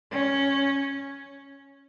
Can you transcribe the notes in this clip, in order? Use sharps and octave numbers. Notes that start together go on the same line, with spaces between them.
C#4